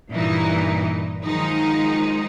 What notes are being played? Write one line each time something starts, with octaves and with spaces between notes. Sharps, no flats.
G2 A#2 E3 D#4
D#3 F3 F#3 G#3 D#4